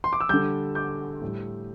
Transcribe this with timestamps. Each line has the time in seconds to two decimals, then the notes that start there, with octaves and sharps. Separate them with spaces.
0.04 C6
0.13 D6
0.21 E6
0.29 D3 G3 D6 G6
0.75 D6 G6
1.21 A2 G3